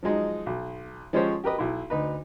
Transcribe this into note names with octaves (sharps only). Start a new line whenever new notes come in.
F3 F#3 G#3 D#4
B1
F3 G#3 C#4 G4 C5 C#5
G4 A#4 B4 D#5
B1 E4
D2 D#4 B4